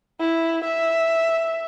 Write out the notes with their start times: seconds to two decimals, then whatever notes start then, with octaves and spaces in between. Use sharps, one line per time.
0.20 E4
0.65 E5